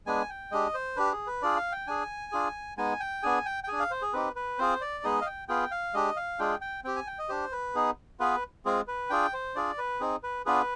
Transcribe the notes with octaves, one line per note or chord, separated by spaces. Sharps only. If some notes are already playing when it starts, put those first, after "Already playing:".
G#3 B3 D4 G#5
G5
G#3 D4 G4 D#5
C5
D4 G4 B4
G#4
B4
D4 F4 G#4 D5
F5
G5
D4 G#4 G#5
D4 F4 G#4
G#3 B3 D#4 G#5
G5
B3 D4 G#4 G#5
G5
G5
D4 G#4 G#5
F5
C5
G#4
C4 D#4 G4 B4
B4
C4 F4 G#4 C5
D5
G#3 B3 D#4 G#4 D#5
F5
G5
B3 F4 G#4 G5
F5
G#3 D4 G4 D#5
F5
G#3 D4 F4 G#4 G5
G5
C4 G4 G5
G#5
G5
D#5
D4 G4 C5
B4
B3 D#4 G#4
B3 F4 G#4 B4
G#3 C4 F4 G#4
B4
D4 F4 G#4 G5
C5
D4 F4 G#4 D5
B4
C4 D#4 G#4
B4
B3 D4 F4 G#4 B4